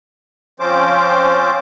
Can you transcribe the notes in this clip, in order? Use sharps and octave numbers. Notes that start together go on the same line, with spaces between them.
F3 C4 C#4 F4 C5 D6